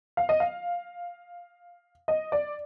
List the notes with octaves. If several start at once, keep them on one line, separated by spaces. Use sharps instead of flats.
F5
D#5
F5
D#5
D5